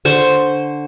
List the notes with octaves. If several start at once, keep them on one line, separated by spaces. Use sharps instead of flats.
D3 C5 C#6